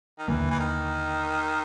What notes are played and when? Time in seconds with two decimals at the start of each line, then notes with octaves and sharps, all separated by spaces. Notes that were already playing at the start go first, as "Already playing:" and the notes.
0.19 D#3
0.28 D#2 D3 E3 F#3 A#3
0.51 E3
0.60 D#3